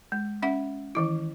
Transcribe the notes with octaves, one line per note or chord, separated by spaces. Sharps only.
G#3
C#4 E5 F#5
D#3 E3 E4